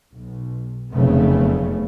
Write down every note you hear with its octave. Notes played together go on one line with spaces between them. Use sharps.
B1
F1 F#2 C#3 A3 B3